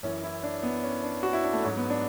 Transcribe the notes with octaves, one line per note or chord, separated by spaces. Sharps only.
F#2 E3 C#4
E4
D4
B3
C#4
D4
F#4
E4
D4
A3
G#2 F#3 C#4
B3
D4